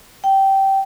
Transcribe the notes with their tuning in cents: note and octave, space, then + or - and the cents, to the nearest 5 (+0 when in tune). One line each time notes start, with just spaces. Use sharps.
G5 -15